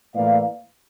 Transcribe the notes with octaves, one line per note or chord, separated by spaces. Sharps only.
A2 E3 A#3 E4 D5 F5